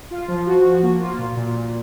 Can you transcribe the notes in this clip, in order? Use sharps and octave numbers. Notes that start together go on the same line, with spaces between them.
F4
F3
F#4
F#4
A#3
F4
A#2
A#2
A#2